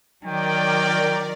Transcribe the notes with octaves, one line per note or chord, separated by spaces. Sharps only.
D#3 F#3 A#4 D5 G5